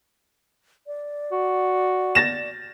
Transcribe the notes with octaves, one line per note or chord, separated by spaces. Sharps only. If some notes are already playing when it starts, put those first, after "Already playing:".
D5
F#4
A6 A#6 E7